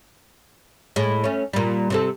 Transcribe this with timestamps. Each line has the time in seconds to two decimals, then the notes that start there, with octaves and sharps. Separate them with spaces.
0.96 A2 G#3
1.24 A3 C#4
1.53 A#2 G3
1.90 C3 C4 A4